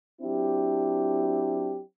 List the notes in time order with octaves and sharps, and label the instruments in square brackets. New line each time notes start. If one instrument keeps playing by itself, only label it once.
[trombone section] F#3 C4 D4 E4 G4